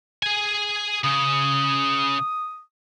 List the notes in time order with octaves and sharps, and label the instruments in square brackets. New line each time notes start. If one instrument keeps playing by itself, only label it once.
[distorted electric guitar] G#4 G#5
[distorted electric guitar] C#3 [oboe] D#6